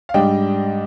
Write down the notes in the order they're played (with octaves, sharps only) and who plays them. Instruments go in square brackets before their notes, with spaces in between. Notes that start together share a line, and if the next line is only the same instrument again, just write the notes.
[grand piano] F5
G#2 G3 D4 D#5 G5